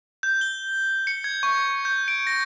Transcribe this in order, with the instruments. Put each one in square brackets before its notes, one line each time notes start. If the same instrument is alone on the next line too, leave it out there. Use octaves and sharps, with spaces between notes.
[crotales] G6
G7
C#7
G#6
C#6
G6
D7
A#6